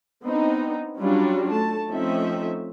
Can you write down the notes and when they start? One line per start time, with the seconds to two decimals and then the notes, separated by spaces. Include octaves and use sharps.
0.22 B3 C4 D4 D#4
0.98 F#3 G3 C#4 D4 F4 F#4
1.51 A3 A5
1.91 F3 A3 C4 C#4 D#4 E5